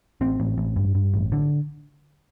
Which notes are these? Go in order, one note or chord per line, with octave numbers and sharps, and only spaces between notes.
A1 C4
A1
A1
G2
G2
A1
D3